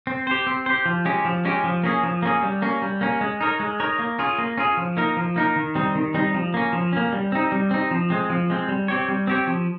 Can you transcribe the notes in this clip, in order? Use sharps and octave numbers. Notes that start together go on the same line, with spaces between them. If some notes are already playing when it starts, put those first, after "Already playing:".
C4
G4 C5
C4
G4 C5
F3
G#3 C#4 G4
F3
G#3 C#4 G4
F3
A#3 C#4 G#4
F3
A#3 C#4 G#4
G3
A#3 C#4
G3
A#3 C#4
G#3
D#4 A#4 C#5
G#3
D#4 A#4 C#5
A#3
C#4 F4 G#4
A#3
C#4 F4 G#4
F3
A#3 D#4 A#4
F3
A#3 D#4 A#4
D#3
G3 C4 D#4
D#3
G3 C4 D#4
F3
A#3 C#4
F3
A#3 C#4
G3
C4 D#4
G3
C4 D#4
F3
G#3 C4
F3
G#3 C4
G3
C4 G4 C#5
G3
C4 G4 C#5
F3